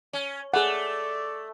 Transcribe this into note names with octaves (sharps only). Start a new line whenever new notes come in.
C#4
A3 G#4 D5 F#5